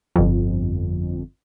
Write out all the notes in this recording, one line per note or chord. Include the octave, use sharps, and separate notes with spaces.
G1 F2